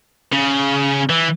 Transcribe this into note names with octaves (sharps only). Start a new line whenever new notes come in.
C#3
E3